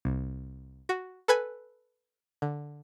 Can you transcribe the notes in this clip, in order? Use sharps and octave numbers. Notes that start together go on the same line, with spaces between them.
C2
F#4
A4 B4 G#5
D3